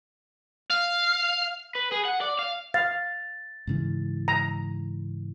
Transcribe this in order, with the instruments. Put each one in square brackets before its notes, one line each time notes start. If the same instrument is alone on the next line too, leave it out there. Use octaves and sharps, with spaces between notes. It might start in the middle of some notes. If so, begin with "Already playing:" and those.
[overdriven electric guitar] F5
B4
G#4
F#5
D5
F5
[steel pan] F5 [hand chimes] A6
[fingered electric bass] G#2 C#3 E3
[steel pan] A#5